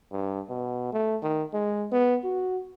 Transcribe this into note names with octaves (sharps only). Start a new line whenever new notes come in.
G2
B2
A3
D#3
G#3
B3
F#4